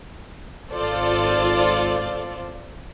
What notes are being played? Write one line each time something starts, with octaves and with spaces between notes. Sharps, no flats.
G#1 F4 A4 C5 D5